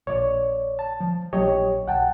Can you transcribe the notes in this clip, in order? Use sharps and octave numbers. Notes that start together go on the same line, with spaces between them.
A#1 C#5 D5
A5
F3
A#1 F#3 G4 C#5 D#5
B1 F#5 G5 A5